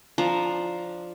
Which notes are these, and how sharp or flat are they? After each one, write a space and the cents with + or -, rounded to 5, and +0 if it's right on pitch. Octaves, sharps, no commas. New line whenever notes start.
F3 +0 D4 +5 A#5 +0